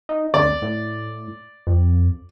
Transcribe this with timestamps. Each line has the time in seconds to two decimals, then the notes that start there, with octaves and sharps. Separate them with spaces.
0.09 D#4
0.34 D2 D5
0.62 A2
1.67 F2